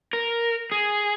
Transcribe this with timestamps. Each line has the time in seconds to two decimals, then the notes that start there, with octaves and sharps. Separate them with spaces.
0.13 A#4
0.72 G#4